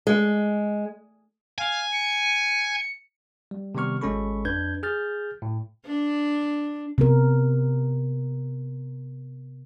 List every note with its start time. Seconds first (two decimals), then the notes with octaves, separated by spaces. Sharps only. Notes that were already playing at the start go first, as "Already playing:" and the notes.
0.07 G#3
1.58 F5 G#5
1.93 C#7
3.51 G3
3.75 C3 D#3 G3 B3 C#6 F6
4.01 G#1 G#3 C#4 A4 B5 C#6
4.45 F2 D4 B4 G6 G#6
4.83 G#4 F6 G6 A6
5.42 A2
5.85 D4
6.98 C3 B3 A#4